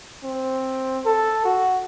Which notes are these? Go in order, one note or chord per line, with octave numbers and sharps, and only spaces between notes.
C4
A4
F#4